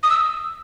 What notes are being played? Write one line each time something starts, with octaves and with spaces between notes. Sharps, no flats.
D#6
E6